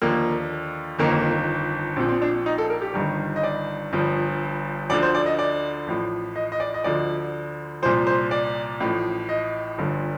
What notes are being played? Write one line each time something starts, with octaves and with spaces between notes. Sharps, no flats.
D#2 D3 F3 A#3
G1 F2 D#3 A#3
A#1 A#2 F3 C4
C4
D4
D#4
A4
A#4
G4
G1 G2 D#3
D#5
D5
G1 G2 F3
D2 D3 F3 D5
C5
D5
D#5
D5
A1 A2 F3
D#5
D#5
D5
D#5
D2 D3 F3 D5
C2 A#2 F3 C5
C5
D5
A1 A2 F3
D#5
G1 G2 D3 F3